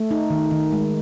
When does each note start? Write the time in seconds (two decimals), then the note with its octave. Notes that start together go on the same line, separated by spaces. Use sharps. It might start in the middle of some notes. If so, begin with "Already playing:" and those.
Already playing: A3
0.11 D#4
0.30 D#3
0.51 D#3
0.72 G#3